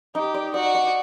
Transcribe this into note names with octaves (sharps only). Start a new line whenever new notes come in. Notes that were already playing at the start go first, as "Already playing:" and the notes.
D#4 G4
D5
F#4 D5
D5